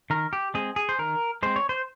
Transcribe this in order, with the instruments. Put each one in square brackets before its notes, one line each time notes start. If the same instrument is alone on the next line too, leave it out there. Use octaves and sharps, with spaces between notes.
[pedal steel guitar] D#3 A#4
G4
G#3 C4 G#4
G#4
C5
D#3 A#4
G#3 C4 C5
C#5
C5